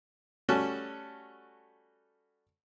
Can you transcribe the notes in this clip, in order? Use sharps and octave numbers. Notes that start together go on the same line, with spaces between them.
G3 A3 C#4 F#4 A4